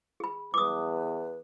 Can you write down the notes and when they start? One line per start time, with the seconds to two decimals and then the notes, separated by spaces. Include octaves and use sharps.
0.20 G#4 B5
0.54 E2 B4 D6 D#6